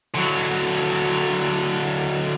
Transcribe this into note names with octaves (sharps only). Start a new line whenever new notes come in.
D3 F#3